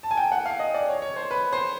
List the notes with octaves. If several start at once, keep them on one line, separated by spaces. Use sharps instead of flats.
A5
G#5
G5
F#5
F5
D#5
D5
C#5
C#5
C5
B4
C5